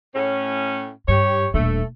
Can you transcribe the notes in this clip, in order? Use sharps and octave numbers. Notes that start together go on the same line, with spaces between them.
A2 C#4
G2 G4 C#5
D#1 A3 D4